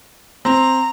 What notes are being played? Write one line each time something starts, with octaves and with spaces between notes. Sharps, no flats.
C4 A#5